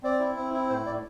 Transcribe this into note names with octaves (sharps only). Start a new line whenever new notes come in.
C4 D5
E4
C4
E4
A2 C5
A2 D5